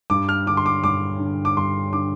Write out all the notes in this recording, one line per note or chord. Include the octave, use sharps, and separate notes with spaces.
G2 D6
F6
D3 D6
C6
D6
G2 D6
D3
D6
G2 C6
D3 D6